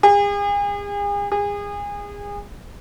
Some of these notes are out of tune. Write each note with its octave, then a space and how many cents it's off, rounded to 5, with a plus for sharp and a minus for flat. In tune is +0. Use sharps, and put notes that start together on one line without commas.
G#4 -40
G#4 -30